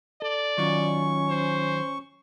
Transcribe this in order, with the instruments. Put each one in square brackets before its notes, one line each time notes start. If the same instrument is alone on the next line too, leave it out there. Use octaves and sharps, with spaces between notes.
[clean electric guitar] A4 [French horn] D5
[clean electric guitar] D#3 F#3 F4 [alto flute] C#4 [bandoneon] C#6
[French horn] C5